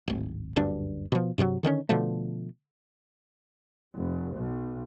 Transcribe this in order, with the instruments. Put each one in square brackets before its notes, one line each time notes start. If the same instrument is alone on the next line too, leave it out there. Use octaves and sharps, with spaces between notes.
[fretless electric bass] D1 G#1
F#1 D2 G2 D4
B2 F3
G2 C3 F3 F#3
D3 D#3 G#3 C#4
B2 D3 F3 A3
[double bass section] F1
B1